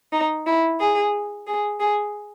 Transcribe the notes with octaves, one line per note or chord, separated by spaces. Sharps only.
D#4
E4
G#4
G#4
G#4